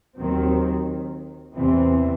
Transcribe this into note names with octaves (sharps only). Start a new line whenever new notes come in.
D#2 D#3 F#3 C4
E2 C3 E3 C4